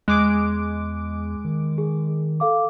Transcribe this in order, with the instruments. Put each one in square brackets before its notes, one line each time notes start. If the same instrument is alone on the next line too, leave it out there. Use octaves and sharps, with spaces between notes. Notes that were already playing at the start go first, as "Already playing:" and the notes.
[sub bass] E2 [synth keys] G#3 D6 D7 [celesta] F#6
[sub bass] D#3
[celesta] G#4
A4 F5 D6